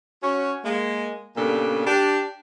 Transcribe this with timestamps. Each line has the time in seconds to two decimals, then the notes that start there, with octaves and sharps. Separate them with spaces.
0.22 C#4 F#4
0.63 G#3 A#3
1.36 A#2 C#3 G3 B3 D4 A4
1.86 D4 G4